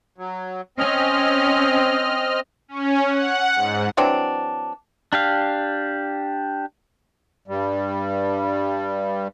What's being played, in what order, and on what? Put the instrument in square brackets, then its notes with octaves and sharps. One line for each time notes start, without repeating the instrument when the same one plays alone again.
[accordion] F#3
[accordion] C4 D#5 F6 [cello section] C#4
[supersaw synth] C#4
F#5
G#2
[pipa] E3 F#3 C4 D4
[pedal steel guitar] D4 G4 F5
[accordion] G2 G3